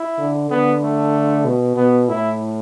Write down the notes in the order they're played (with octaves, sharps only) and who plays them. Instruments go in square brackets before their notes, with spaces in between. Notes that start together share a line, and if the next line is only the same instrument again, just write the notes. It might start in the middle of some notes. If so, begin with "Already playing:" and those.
Already playing: [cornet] E4
[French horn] D3
[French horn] D3 [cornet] B3
[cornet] A3
[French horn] B2
[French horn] B2 [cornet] B3
[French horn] A2 [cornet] E4